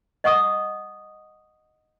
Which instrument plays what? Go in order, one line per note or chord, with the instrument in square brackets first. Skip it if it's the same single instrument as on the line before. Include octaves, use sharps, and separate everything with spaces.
[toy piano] D#5 F#5 C#6 D#6